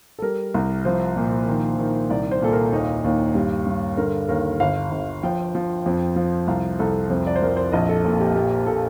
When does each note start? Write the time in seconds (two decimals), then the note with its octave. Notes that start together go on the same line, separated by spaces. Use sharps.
0.19 A4
0.22 G3 A#4
0.54 C2
0.85 F3 C5
1.16 A#2
1.48 D#3
1.79 D#3
2.10 C2 D5
2.31 C5
2.42 A#2 A4
2.52 A#4
2.72 D#2 D#4
3.04 D#2
3.35 G2 G4
3.67 G2
3.97 D3 A#4
4.28 D#2 A#4
4.60 G1 F5
4.91 G1
5.23 F3 G5
5.55 F3
5.86 F2
6.16 F3
6.48 C2 F5
6.79 C2 A4
7.10 F2 C5
7.27 D5
7.36 C5
7.42 F2 A#4
7.57 C5
7.72 A#1 D#5
7.89 A4
8.04 A#2 A4
8.20 G4
8.35 A#2 G4
8.66 A#2 A4